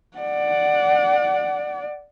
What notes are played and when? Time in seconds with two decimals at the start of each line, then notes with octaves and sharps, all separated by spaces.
0.17 D5 F#5